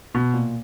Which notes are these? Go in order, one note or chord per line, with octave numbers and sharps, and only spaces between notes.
B2
A#2